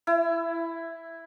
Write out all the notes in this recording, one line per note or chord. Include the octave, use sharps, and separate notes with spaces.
E4